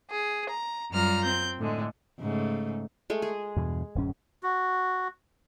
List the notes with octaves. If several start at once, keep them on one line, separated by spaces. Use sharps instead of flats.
G#4
A#5
F#2 G3 F4 A#5 F6
C4 G6
A2 D3 G#3
G#2 C#3 A3
G#3 A3
G#4
E2 G2 B2
D1 F#2 C#4
F#4